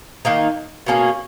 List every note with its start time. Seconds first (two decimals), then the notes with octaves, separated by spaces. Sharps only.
0.25 D#3 A#3 D#4
0.86 B2 A#3 C#4 G#4